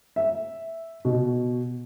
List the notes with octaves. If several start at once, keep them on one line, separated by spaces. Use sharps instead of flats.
E5
B2